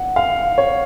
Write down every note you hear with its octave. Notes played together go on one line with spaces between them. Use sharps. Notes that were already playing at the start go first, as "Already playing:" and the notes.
Already playing: F#5
F5
C#5